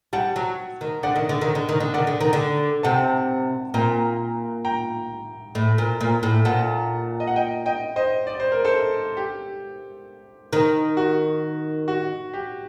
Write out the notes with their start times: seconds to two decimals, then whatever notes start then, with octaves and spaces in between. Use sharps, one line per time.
0.13 G3 F#5 A5
0.36 F#3
0.81 D#3
1.03 D3 D5 F#5
1.16 D#3
1.29 D3
1.41 D#3
1.55 D3
1.69 D#3
1.80 D3
1.94 D#3 D5 F#5
2.07 D3
2.21 D#3
2.33 D3
2.83 C3 F#5 A5
3.74 A#2 G5 A#5
4.65 G5 A#5
5.55 A2
5.78 A#2
6.01 A#2
6.23 A2
6.45 A#2 F#5 A5
7.20 D#5
7.27 F#5
7.36 D#5 G5
7.66 D#5 G5
7.96 C5 D#5
8.27 D5
8.40 C5
8.52 A#4
8.64 A4 C5
9.17 G4
10.53 D#3
10.97 F#4
11.88 F#4
12.34 G4